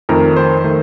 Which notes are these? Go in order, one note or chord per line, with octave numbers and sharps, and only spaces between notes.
F2 D#3 A3 A#4
C5
D#3 A3